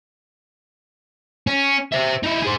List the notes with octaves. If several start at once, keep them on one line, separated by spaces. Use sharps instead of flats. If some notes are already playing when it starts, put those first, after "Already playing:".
C#4
C5 E5
D#4 E4
G#4 C5